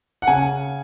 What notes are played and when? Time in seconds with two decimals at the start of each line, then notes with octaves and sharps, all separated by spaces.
0.22 F#5
0.27 C#3 G#5